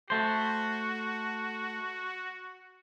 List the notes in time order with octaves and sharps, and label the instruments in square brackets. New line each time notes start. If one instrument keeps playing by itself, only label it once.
[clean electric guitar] A3 C5 [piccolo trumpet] F#4